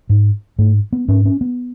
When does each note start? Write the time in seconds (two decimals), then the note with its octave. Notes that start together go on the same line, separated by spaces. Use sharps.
0.09 G#2
0.59 G#2 A3
0.92 B3
1.08 G#2 C#4
1.25 C#4
1.41 B3